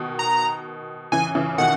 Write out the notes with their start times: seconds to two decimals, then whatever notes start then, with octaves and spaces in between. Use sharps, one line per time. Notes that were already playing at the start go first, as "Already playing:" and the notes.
Already playing: B2 D#3
0.19 A#5
1.12 C#3 E3 G#5
1.35 C#3 E3
1.58 B2 D#3 F#5